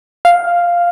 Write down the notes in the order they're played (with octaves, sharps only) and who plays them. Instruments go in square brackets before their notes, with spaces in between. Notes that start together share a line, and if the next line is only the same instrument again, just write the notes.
[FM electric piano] F5